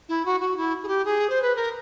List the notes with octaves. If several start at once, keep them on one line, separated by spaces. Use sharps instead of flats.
E4
F#4
F#4
E4
G#4
G4
G#4
C5
B4
A#4